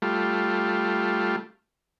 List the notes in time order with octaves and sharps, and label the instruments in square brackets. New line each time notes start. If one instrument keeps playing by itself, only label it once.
[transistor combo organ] G3 A3 F4